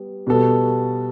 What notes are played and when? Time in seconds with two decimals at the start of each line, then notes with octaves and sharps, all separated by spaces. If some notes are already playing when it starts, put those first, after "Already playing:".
Already playing: G3 B3
0.27 B2 G3 B3 F#4 A4